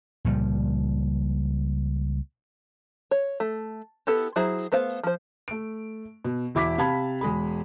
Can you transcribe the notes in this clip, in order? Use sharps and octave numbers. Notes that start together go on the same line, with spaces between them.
C#2 A#2 F3 G3
C#5
A3
B3 E4 G4 A4
F#3 E4 G#4 C5 A#5
A3 B3 C5 F5
F3 C5
A3 D7
B2
E1 E4 D6 B6
C3 F5 A5 B5 G#6
E1 G#3 G#4 B5